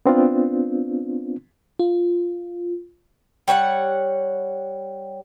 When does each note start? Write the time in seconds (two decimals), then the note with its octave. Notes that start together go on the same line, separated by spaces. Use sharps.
0.06 B3 C4 D4 F4
1.79 F4
3.48 G3 C#5 E5 F#5